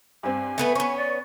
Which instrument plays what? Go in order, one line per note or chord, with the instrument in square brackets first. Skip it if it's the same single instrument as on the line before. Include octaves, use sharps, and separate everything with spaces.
[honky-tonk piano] G2 C4 [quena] G#5
[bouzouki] A3 B3 B4
[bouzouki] B3 C#4 [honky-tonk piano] C#6
[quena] D5